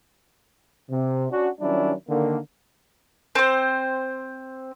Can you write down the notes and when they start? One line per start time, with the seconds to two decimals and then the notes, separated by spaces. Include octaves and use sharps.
0.90 C3
1.31 C#4 D4 F#4
1.61 D#3 F#3 G3 C#4 D4 E4
2.10 D3 D#3 A#3
3.35 C4 C5